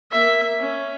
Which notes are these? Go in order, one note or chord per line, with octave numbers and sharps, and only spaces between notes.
A#3 E5
C#4